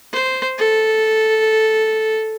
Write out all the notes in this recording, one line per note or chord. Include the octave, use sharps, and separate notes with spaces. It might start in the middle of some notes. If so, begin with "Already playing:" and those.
C5
A4